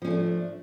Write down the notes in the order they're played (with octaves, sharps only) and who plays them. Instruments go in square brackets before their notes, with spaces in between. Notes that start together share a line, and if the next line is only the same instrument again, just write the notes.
[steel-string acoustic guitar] F3
C#4
A3
D4